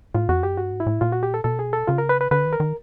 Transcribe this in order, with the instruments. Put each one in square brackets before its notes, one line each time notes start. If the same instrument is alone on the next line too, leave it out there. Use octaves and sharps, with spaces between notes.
[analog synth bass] A2 [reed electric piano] F4
[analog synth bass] F2 [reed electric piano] F#4
[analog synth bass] F#2 [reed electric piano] G4
[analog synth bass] G2 [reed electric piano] F#4
[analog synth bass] G#2
[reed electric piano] E4
[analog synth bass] A2
[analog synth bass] A#2 [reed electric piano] F4
[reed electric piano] F#4
G4
A4
[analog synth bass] B2 [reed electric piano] A4
[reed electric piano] G#4
A4
[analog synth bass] C#3 [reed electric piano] F4
[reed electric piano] A#4
B4
B4
[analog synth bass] D3 [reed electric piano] B4
[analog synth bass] D#3
[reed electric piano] A#4
[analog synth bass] D#3